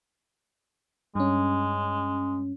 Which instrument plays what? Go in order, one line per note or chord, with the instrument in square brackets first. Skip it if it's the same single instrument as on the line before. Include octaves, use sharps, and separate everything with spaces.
[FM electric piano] G2 C#4 [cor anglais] G#3